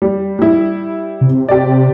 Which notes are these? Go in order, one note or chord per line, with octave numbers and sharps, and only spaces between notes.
G3
G3 E4
C3
G4 D5